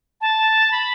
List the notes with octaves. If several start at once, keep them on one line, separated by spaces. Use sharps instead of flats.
A5
B5